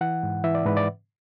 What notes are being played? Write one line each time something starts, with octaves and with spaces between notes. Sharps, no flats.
E3 F#5
G#2
E3 E5
D5
G#2 B4
D5